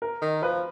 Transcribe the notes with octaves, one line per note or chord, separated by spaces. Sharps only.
A#4
D#3
F3 B4